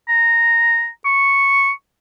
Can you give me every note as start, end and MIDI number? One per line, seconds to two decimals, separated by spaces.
0.09 0.89 82
1.05 1.71 85